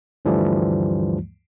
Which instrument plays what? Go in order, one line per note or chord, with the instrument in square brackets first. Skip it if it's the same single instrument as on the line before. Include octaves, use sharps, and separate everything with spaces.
[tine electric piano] D2 G2 E3 F3 G3 A3